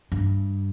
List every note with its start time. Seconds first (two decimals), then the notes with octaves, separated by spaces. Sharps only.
0.12 G2